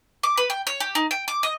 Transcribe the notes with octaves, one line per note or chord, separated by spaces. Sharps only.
D6
B4
G5
C#5
G4
D#4
G5
D6
D#5